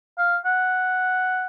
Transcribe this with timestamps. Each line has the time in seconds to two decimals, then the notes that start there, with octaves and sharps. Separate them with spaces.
0.18 F5
0.45 F#5